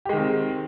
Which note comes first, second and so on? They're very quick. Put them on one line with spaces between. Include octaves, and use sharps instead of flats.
G4 G#3 D#3 C4